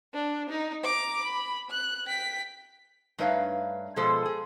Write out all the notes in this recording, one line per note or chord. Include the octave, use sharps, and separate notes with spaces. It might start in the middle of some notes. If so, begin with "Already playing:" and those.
D4
D#4
A#5 D6
B5
F#6
G5 B6
G2 A3 D#4 B4 C#5 F5
B2 F3 G#3 G#4 A4 C5
G#4